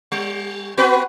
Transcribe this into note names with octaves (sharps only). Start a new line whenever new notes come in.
G3
B3 F#4 B4